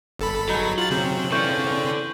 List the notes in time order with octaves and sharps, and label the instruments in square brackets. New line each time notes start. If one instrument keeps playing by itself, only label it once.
[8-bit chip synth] G1 A4 B5
[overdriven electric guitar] F#3 [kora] D#4 G#4
[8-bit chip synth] F4 A6 [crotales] F#7
[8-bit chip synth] C#3 C4 [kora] G4
[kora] E3 F4 [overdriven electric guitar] A4 D5 [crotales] C#6 G6